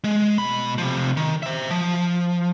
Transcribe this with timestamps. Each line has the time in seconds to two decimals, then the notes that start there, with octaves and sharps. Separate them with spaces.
0.04 G#3
0.38 B2 B5
0.78 C3 F3
1.17 D#3
1.43 C5 E5
1.71 F3